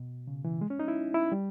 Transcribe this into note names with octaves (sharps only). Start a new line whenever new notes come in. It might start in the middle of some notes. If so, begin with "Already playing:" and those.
Already playing: B2
C#3
E3
G#3
C#4
D#4
E4
E4
G3